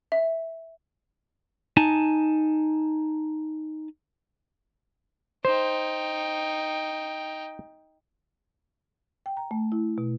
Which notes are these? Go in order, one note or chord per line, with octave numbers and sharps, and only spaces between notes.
E5
D#4 G#5 A5
D#4 C5 G5
G5
A#5
A3
E4
B2